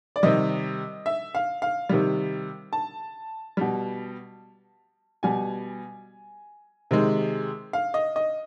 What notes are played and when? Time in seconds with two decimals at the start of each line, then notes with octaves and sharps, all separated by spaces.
0.16 D5
0.23 C3 D#3 G3 D#5
1.06 E5
1.35 F5
1.62 F5
1.89 C3 D#3 G3
2.73 A5
3.57 B2 G3
5.23 B2 G3 G#5
6.91 C3 D#3 G#3
7.73 F5
7.94 D#5
8.16 D#5